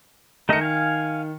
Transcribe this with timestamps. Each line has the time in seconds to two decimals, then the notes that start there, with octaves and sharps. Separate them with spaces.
0.49 D#3 A3 D#4 D#5 C#7
0.61 F5 G#5